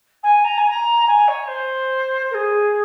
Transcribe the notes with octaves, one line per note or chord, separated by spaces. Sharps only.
G#5
A#5
G#5
A#5
G#5
C#5
C5
A#4
G#4